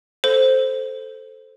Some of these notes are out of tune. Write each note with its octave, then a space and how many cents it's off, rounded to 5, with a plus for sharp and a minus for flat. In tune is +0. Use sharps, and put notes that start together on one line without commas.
A4 +0 C5 +0